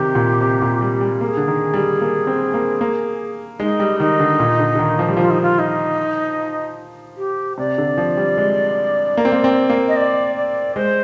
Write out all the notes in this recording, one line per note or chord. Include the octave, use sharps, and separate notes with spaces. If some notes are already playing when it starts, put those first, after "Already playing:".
Already playing: C3 D#3 G4
A#2
C3
A#2
G3
G3
A#3 G#4
D3
D#3
G3
A#3
C4
A#3
A#3
G#3 D#4
G3
D#3 D#4
D3
A#2
D3
D3
D#3
F3
G3
F3 F4
D#4
F4
D#4
G4
C3 D5
D3
F3
G3
G#3
A#3
C4
A#3
C4
A#3
D#5
D5
D5
G#3 C5